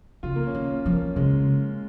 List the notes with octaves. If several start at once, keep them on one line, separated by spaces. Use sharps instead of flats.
C#3 F4
A#3
C#4
D#3
C#4
F3
A#3
C#3 G#3